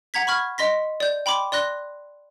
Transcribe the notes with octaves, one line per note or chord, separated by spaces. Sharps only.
F#5 A#5 G#6 B6
B5 C#6 F6 G#6
D#5 C6 A#6 B6
D5 G6
G5 B5 C6 D6
D5 C6 F#6 A#6 G7